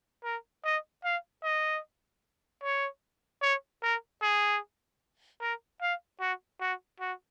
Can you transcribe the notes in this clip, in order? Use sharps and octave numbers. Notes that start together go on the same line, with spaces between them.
A#4
D#5
F5
D#5
C#5
C#5
A#4
G#4
A#4
F5
F#4
F#4
F#4